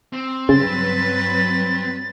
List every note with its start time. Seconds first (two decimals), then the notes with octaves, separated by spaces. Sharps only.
0.13 C4
0.49 G2 C#3 F#3 B4 A6